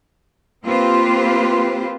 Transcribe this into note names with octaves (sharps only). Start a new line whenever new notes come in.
A#3 C4 F4 G4 B4 C5